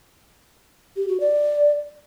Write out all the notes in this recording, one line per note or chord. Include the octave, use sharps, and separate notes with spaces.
G4
F#4
D5